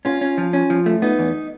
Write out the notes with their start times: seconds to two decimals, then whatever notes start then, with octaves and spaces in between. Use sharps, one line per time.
0.05 C#4 F4
0.21 C#4
0.38 F3
0.53 C#4
0.70 F3
0.86 A3
1.02 B3 D#4
1.19 E2